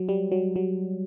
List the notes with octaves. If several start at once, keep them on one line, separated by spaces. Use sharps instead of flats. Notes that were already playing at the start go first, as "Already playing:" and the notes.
Already playing: F#3
G3
F#3
F#3